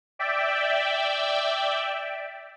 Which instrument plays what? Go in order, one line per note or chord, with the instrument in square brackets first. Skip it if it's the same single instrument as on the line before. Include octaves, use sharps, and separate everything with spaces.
[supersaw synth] D5 E5 G5